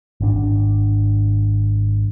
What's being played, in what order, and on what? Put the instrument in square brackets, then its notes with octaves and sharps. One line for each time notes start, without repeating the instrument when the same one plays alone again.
[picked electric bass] G#1 D4